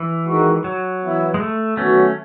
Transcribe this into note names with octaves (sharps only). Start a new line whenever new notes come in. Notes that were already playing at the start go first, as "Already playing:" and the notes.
Already playing: E3
D#3 G#3 D#4 F#4
F#3
E3 B3 E4
G#3
A3
D#3 F#3 A3 B3 C#4 F#4